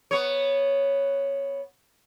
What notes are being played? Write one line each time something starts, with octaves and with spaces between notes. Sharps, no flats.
B3 C#5